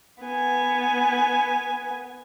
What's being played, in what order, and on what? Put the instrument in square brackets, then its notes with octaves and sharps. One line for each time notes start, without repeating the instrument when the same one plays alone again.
[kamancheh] B3 G#5